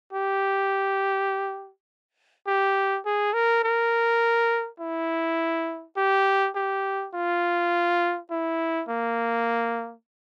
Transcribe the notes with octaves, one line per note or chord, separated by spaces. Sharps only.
G4
G4
G#4
A#4
A#4
E4
G4
G4
F4
E4
A#3